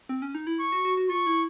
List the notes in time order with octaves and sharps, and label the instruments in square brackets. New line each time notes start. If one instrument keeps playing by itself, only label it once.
[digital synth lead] C4
C#4
D#4
E4
[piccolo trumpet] C#6
[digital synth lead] F#4
F#4
F#4
[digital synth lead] F4 [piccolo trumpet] C#6
[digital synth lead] E4